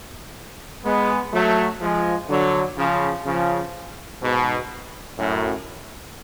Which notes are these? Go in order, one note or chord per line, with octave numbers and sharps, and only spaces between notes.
G#3 B3
F#3 A3
F3 G#3
D3 F#3
C#3 F3
C#3 F3
G#2 B2
F#2 A2